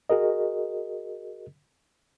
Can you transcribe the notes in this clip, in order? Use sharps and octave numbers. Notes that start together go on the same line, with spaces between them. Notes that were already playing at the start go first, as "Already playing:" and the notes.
F#4 G#4 A#4 D#5